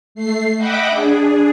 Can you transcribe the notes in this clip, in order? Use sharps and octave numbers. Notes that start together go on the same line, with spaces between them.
A3 C7
D#5 E5 F#5 G5 B5 D6
D4 G#4